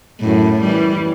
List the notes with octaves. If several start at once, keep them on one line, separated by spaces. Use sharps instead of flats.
F#2 A2
E3 G3